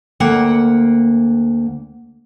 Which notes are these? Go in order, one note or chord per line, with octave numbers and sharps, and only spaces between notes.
D2 A#3 F#5 G5